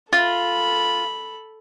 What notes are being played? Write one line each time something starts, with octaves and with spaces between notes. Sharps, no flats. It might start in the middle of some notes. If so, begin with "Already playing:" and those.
F4 A4 B5